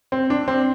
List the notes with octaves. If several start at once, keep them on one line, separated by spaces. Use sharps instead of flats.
C4
D4
C4